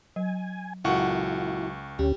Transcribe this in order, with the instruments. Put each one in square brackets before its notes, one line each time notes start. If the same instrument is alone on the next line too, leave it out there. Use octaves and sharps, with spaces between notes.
[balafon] F#3 [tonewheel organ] G#5
[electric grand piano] C#2 F#5 C#6 [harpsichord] F#2 A#2 D3 [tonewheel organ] E4
[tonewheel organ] D2 C#4 G4 [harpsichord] G3